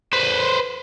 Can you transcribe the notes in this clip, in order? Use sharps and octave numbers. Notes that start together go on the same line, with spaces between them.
B4 C5